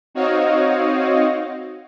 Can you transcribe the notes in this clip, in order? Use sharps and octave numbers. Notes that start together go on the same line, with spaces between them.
C4 D#4 F#4 C#5 D#5 F5